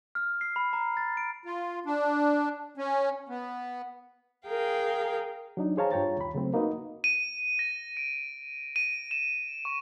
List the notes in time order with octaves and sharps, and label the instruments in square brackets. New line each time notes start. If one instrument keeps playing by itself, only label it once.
[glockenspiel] F6
C7
B5
A#5
A6
D7
[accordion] F4
D4
C#4
B3
[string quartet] G#4 A#4 F5 G5
[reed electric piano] F#3 D4 D#4
G#4 C5 C#5 F5 A5 A#5
G2 F4 C#5 G5 A#5 A6
D#2 B5
C#3 F#3 A3 C4
A#3 D#4 F#4 B4 D#5
[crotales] D#7
A#6
D7
D#7
E7
C#6